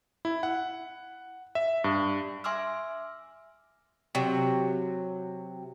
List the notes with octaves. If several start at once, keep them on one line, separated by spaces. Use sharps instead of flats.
E4
F#5
E5
G2
E5 G#5 C6 D6 E6 F6
C3 F#3